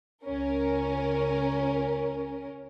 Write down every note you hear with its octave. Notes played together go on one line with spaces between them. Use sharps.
C#2 C#4 A#4